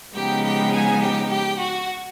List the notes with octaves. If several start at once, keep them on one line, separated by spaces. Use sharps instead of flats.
C#3 F3 G#3 B3 D#4 G4 G5
G4 G5
G#4 G#5
G4 G5
G4 G5
F#4 F#5